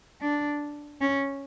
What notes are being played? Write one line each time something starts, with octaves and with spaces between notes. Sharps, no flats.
D4
C#4